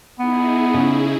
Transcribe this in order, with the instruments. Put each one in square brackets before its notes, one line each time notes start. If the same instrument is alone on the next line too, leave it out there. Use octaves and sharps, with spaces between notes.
[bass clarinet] B3 [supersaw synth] D#4 E4 G#4
[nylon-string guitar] C#3